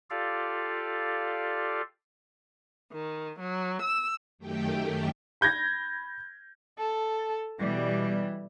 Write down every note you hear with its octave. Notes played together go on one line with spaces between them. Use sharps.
F4 G4 A4 D5 F5
D#3
F#3
E6
F#2 D#3 A3 G4 G5
B5 G6 G#6 A#6
A4
B2 E3 G3